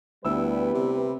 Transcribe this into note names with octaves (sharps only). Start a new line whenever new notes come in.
D2 G3 B3 E4 B4 E6
C3